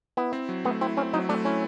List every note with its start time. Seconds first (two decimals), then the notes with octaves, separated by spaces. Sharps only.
0.17 B3 E4
0.33 C4
0.49 F#3
0.65 A3 B3
0.81 C4 E4
0.97 C4 C#4
1.13 F#3 D#4
1.29 A3 D4
1.45 C#4 E4